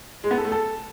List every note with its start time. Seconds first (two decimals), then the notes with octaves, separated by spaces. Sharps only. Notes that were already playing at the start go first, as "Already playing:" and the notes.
0.24 G#3
0.31 B3
0.38 A4
0.45 A3
0.52 A4